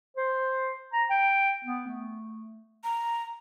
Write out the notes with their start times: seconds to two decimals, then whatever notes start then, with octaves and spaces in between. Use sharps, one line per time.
0.17 C5
0.93 A#5
1.10 G5
1.64 B3
1.88 A3
2.84 A#5